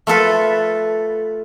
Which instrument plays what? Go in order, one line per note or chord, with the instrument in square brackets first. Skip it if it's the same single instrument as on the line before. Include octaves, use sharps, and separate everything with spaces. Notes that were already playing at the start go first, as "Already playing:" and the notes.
[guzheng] A3 F4 A4 B4